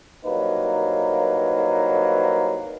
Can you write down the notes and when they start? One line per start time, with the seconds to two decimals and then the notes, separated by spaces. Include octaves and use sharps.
0.25 C2 F#3 A#3 D#4 B4